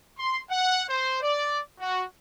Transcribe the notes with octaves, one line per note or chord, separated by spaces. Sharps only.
C6
F#5
C5
D5
F#4